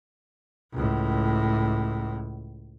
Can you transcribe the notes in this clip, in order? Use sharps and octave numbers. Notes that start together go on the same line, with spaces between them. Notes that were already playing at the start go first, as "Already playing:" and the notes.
C#2 A2